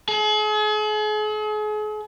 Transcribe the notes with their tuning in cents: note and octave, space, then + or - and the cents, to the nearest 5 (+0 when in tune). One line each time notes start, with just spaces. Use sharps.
G#4 +40